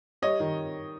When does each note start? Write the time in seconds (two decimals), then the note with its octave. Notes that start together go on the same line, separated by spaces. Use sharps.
0.22 G3 C#5 D#5
0.40 D#3